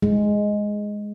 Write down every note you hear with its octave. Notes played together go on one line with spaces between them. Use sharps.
G#3